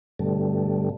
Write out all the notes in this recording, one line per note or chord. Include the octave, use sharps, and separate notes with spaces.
G2 B2 D3 G3 A3